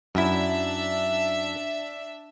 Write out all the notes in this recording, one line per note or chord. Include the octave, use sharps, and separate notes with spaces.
F#2 D4 E4 E5